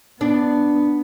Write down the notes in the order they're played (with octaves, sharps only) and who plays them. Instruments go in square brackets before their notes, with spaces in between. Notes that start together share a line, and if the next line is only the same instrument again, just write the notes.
[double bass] B3 [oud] D4